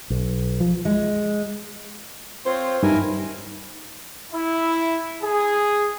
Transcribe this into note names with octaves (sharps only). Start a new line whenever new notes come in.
B1
F3
G#3
C4 F4 C5 C#5
G2 D#4 E4 A#4 G#5
E4
G#4